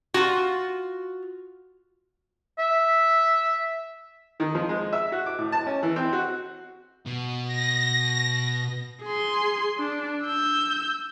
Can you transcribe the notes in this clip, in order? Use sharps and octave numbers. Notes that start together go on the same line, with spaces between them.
F4 F#4
E5
D#3
F3
G#3
E5
F#4
D6
A2
A5
C#4
E3
C4
F#4
B2
A#6
G#4 C6
D4
E6 G6